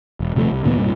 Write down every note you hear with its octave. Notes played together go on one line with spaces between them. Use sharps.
E1
D#1 C3 F3 A3
C2
D2 A#2 E3 B3
C2 G2 A#2